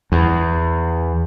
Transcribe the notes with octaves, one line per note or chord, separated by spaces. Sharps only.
E2